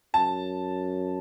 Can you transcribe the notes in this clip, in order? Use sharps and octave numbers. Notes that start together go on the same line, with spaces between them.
F#2 A5